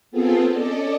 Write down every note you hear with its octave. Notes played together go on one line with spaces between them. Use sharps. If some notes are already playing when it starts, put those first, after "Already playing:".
B3 C4 F4 G#4 A4
C#4 A4 D5 D#5